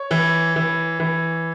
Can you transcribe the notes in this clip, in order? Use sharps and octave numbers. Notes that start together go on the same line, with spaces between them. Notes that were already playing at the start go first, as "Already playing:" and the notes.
Already playing: C#5
E3
E3
E3